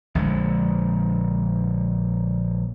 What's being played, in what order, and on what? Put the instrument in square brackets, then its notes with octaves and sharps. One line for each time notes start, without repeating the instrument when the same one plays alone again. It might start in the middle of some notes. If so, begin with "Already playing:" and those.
[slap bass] A#1 D3 G#3